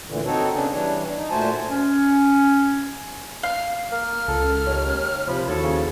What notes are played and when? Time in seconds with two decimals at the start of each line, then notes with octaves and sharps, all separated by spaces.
0.07 D2 A#2 D3 E3
0.25 C4 D#4 F#4 A4 C#5
0.52 C#3 B3 C#4 D4
0.71 E3 G3 D4 C#5
1.14 D#4
1.30 A#2 A3 F#4 C5 G#5 A5
1.69 C#4
3.43 F5
3.92 A#3 F6
4.28 C#2 A4
4.67 D#2 C#5
5.27 C3 F3 B5
5.48 D#2 E4 F#4 A4 C#5
5.63 C#3